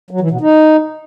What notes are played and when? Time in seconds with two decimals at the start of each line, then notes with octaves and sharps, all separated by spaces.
0.11 F#3
0.21 E3
0.31 B2
0.41 D#4